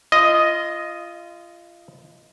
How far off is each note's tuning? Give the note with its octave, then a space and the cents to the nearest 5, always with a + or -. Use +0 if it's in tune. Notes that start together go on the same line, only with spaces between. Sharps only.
F4 -25 D#5 +0